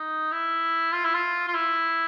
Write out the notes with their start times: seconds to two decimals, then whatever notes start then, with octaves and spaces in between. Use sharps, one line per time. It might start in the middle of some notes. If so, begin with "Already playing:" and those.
Already playing: D#4
0.32 E4
0.93 F4
1.05 E4
1.15 F4
1.48 F4
1.55 E4